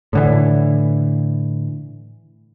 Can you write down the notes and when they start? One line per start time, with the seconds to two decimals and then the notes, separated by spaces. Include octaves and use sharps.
0.13 A2 D3 E3